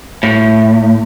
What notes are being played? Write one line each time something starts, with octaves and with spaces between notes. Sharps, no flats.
A2